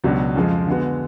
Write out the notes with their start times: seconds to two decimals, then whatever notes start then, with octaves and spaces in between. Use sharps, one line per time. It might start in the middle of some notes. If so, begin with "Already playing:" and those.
0.04 C#2 B2 F#3 B3 D4
0.36 F2 C#3 F3 G#3
0.67 D3 G#3 B3 F#4